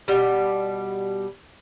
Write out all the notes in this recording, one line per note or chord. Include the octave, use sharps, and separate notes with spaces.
B2 G3